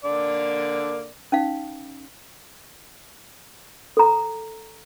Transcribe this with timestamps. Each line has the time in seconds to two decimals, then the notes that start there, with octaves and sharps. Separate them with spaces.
0.05 D3 A#3 D5
1.32 C#4 D#4 F5
3.97 A4 A#5